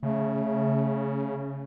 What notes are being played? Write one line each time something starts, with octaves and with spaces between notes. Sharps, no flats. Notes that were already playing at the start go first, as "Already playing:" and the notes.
C#3 A3